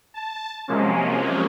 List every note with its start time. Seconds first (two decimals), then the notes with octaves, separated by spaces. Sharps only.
0.14 A5
0.68 C3 F3 F#3 G#3 A#3 C#4